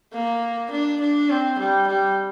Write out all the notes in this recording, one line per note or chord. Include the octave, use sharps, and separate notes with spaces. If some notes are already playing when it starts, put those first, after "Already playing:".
A#3
D4
D4
C4
G3
G3